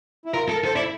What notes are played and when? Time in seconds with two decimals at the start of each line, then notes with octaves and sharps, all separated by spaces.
0.25 E4
0.33 F4 A#4
0.49 A4
0.54 A#4
0.65 A4 C5
0.75 E4 D5